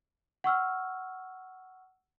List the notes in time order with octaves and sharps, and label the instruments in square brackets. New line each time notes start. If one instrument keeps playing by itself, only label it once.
[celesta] F#5 C#6 E6 F6